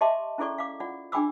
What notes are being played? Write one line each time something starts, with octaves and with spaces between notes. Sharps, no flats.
G4 D#5 E5 A5 C6 D6
C#4 E4 G#4 A4 D5 C#6
F5 D6
F4 D5 F#5
D4 G#4 G5 B5 D6 E6